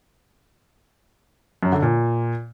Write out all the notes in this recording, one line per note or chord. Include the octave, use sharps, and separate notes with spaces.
F#2
D3
A#2